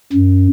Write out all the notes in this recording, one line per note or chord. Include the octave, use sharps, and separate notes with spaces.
F#2